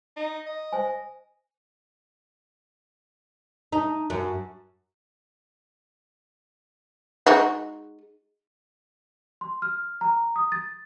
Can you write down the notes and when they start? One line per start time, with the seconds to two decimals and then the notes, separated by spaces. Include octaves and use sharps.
0.17 D#4
0.46 D#5
0.73 C5 G#5
3.72 D#4
4.10 F#2
7.27 G#3 D#4 F#4
9.41 C6
9.62 F6
10.01 A#5
10.36 D#6
10.52 A6